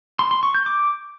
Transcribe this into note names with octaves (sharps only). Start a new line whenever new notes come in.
C6
C6
C#6
G6
D6